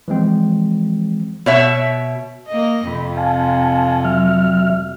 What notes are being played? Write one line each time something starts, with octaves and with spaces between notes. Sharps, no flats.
E3 F3 G#3 C4
B2 C#5 E5
A#3 D#5
F2 C3 B5
F5 G#5 A5
F#3 E5 F6